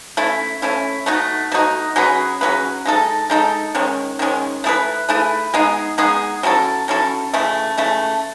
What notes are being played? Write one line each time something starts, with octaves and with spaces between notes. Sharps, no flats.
A3 C#4 E4
A3 C#4 E4
B2 A3 D#4 F#4
B2 A3 D#4 F#4
F#3 C#4 G#4 B4
F#3 C#4 G#4 B4
G#3 D#4 A4
G#3 D#4 A4
D#3 G#3 C#4
D#3 G#3 C#4
A3 E4 G#4 B4
A3 E4 G#4 B4
G#3 B3 D#4 G#4
G#3 B3 D#4 G#4
F#3 C#4 E4 A4
F#3 C#4 E4 A4
C#3 E3 A3
C#3 E3 A3